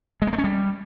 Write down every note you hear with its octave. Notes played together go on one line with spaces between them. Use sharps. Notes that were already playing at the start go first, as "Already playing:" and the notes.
G#3
A#3
A3
C#4
G3